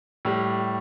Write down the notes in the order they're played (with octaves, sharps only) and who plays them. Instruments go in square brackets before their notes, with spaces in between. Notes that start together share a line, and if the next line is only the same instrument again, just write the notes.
[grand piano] A2 G3